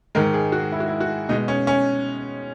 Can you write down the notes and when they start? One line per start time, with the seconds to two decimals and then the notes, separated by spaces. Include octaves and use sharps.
0.15 G#2 D#3 G#3 A#4
0.34 G#4
0.52 F#4
0.72 E4
0.80 F#4
0.88 E4
1.01 F#4
1.29 B2 D#4
1.32 G#3
1.48 C#4
1.67 C#4